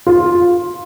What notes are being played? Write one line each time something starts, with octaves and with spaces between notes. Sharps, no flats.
F4